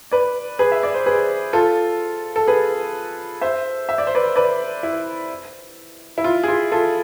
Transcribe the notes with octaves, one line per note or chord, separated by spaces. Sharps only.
B4 D5
G#4 B4
E5
D5
C5
G#4 B4
F4 A4
A4
G#4 B4
C5 E5
E5
D5
C5
B4 D5
B4 D5
E4
E4
F4
G#4
F4
F4 A4